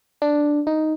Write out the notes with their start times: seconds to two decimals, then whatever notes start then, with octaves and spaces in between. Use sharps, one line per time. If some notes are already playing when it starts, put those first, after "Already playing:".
0.22 D4
0.67 D#4